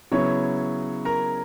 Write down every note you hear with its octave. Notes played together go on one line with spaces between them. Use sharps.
C#3 F#3 B3 E4 C#5 C#6
A#4 A#5